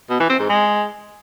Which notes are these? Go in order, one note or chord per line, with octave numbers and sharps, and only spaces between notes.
B2
E3
C4
G#2
G#3